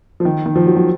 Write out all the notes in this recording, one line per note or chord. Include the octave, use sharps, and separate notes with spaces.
F3
D#3
D#3
F3
F#3
F#3